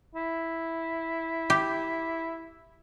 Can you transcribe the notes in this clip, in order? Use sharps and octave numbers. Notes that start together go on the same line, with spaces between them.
E4
G4